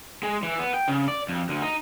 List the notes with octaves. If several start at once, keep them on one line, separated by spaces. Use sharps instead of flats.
G#3
E3
B3
G5
C#3
D5
F2
D2
D#4